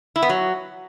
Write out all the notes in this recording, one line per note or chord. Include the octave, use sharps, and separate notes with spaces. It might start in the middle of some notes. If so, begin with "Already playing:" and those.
E4
B3
F#3